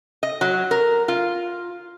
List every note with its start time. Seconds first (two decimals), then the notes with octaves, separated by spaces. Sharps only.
0.23 D#5
0.41 F#3
0.71 A#4
1.08 F4